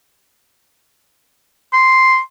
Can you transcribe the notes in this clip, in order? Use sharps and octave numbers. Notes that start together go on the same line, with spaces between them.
C6